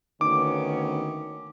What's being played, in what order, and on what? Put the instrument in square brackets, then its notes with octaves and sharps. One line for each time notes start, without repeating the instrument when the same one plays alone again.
[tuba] D2 [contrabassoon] D#3 [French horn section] A#3 B3 C#4 [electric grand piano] D6